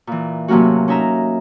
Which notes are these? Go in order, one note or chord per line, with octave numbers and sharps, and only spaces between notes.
A#2 E3
A2 C3 F#3 A#3 C#4 F#4
C#4 D#4 E5 A#5